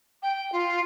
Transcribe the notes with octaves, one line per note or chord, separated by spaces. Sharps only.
G5
F4